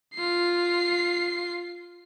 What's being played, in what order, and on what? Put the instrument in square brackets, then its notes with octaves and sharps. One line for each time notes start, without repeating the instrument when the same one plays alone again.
[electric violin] F4 C7